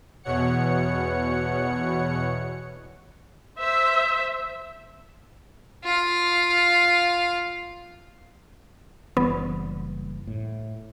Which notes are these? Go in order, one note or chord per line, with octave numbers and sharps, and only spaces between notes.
E2 B2 C#5 F#5 C#7
C5 E5
F4 F5
F#1 E3 G3 B3
A2